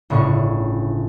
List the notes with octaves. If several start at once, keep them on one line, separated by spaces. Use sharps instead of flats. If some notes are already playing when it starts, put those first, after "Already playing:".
G1 A2 C#3 D4 C#6